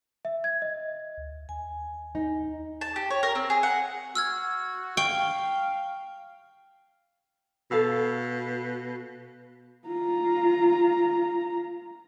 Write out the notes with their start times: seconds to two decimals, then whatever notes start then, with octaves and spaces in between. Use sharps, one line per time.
0.25 E5
0.44 G#6
0.62 D#5
1.18 D2
1.49 D#2 G#5
2.15 D#4
2.81 A5
2.96 G4
3.11 C#5
3.23 A#4
3.35 C4
3.50 G#4
3.63 F#5
4.15 F#4 E6 F6 G#6
4.97 F5 G5 C#6
7.71 B2 A4 F5 E6
9.87 F4 A#5